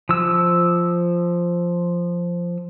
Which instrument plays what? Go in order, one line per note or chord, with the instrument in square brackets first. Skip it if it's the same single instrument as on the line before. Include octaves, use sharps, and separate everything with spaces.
[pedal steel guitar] F3 E6